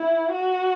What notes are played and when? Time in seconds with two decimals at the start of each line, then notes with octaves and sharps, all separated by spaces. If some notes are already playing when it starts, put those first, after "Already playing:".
Already playing: E4
0.32 F#4